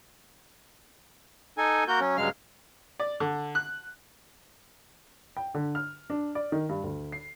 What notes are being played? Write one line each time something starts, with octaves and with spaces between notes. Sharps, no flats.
D#4 A4 G#5
A#3 F#4 A#4 G6
F#3 C#4
G2 C#3 F#3 G#3 F5 F6
D5
D3
F#6
G5
D3
F6
D4
D5
D#3
G2
D2
C7